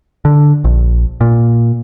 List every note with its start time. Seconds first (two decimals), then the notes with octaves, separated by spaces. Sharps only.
0.25 D3
0.64 A#1
1.21 A#2